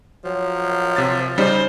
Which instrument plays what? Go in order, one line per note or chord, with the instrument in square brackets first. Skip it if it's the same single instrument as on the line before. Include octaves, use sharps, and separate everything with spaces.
[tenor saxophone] F3 [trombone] F#3
[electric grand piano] C3 A6
[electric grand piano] C#3 G3 D#4 [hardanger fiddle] C5